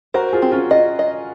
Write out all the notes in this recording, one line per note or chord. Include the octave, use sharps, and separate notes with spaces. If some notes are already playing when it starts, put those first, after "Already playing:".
F#4 A#4 C5
F4 G#4
C4
C#4 F4
C#4 F4 D#5
D#5